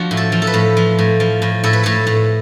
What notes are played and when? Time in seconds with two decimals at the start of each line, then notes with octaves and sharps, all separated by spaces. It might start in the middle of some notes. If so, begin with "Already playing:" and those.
Already playing: F3 D4 F#4
0.11 A2
0.17 A4
0.32 F3
0.42 A4
0.47 B4
0.54 A2
0.77 F3
0.99 A2
1.20 F3
1.42 A2
1.64 A2 A4
1.73 B4
1.83 A2 A4
2.07 A2